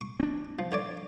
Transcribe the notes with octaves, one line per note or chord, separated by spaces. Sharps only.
C#6
C4 D4
F3
D3 C#5 D5